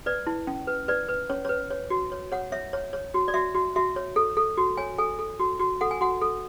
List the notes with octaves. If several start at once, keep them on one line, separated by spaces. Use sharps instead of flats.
B4 D5
E4
C#4
B4
B4 D5
B4
C#4 C#5
B4 C#5
C#5
F#4
C#5
C#5 F#5
C#5 E5
C#5
C#5
F#4
D5
F#4 E5
F#4
F#4 E5
C#5
A4
A4
F#4
C#5 G#5
A4 G#5
A4
F#4
F#4
A4 F#5
G#5
F#4 F#5
A4